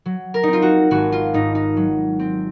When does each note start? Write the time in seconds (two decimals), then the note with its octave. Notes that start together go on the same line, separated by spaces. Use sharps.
0.06 F#3
0.34 A#4
0.43 C4 D#4
0.53 F4
0.62 F#4
0.91 G#1 F#4
1.12 F4
1.34 G#2 D#4
1.55 D#4
1.77 F#3
2.19 C4